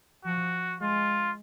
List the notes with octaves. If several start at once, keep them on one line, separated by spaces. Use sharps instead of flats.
F3 F#4
G#3 F4